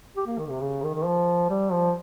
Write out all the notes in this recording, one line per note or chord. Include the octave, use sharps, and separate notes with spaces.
G4
A#3
D#3
C3
C#3
D#3
D#3
F3
G3
F3